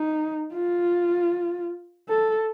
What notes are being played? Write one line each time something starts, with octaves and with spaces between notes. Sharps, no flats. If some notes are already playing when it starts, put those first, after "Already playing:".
Already playing: D#4
F4
A4